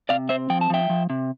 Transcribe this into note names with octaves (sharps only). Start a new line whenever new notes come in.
C3 D5 F5
C4 C5 E5
F3 G5
A5
F3 E5 G5
F3
C3